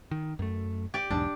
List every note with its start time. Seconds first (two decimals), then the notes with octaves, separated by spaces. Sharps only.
0.11 D#3
0.39 F#2 A3
0.94 G4 D5
1.10 B1 E2 G#2 D4